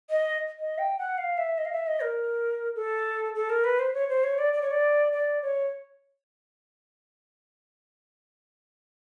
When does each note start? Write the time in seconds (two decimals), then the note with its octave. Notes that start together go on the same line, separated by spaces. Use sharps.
0.10 D#5
0.59 D#5
0.78 G5
0.98 F#5
1.18 F5
1.38 E5
1.58 D#5
1.65 F5
1.72 E5
1.87 D#5
2.02 A#4
2.76 A4
3.35 A4
3.50 A#4
3.64 B4
3.79 C5
3.94 C#5
4.09 C5
4.24 C#5
4.38 D5
4.53 D5
4.62 C#5
4.71 D5
5.12 D5
5.42 C#5